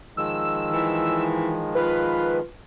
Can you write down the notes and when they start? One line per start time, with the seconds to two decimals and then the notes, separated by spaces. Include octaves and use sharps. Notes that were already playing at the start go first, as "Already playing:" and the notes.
0.17 D#3 F3 G#3 E6
0.72 E3
1.75 F4 B4